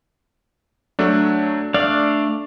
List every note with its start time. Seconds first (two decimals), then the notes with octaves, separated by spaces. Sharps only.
0.99 F#3 A3 D4
1.74 A3 D4 D5 F5